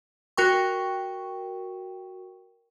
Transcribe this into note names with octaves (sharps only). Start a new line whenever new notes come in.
F#4 A#4 G5 C#6